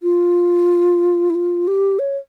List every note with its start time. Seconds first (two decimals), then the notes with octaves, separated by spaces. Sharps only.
0.03 F4
1.30 E4
1.35 F4
1.68 G4
1.99 C#5